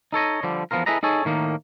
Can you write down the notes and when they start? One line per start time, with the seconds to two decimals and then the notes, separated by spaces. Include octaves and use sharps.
0.13 D#4 A4 C#5 D#5
0.43 D3 F3 G3
0.71 E2 F3 B3 F4 A#4
0.86 E4 G#4 A4 B4 D#5 A#5
1.03 D#4 G#4 A4 C#5
1.25 A2 D#3 A#3 D#4